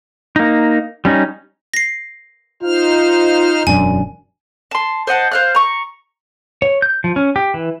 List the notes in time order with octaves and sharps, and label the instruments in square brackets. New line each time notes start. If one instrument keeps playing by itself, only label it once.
[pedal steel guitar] A#3 D#4
G3 C#4 D#4
[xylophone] A#6 C7
[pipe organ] D#4 C5 F6 [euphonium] F4
[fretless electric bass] E1 F#2 D4 [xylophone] G#5
[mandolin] A5 C6
C5 D#5 F#5 A5
C5 F5 F#6
A#5 C#6
[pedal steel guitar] C#5
G6
F3
C#4
G4
E3